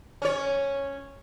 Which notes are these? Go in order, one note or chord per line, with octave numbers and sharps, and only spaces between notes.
C#4 C#5